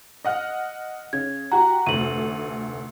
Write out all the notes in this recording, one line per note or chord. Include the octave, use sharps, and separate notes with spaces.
D#5 F#5 F6
C#3 G#6
F#4 G4 F#5 A#5
F1 D2 D#7 F#7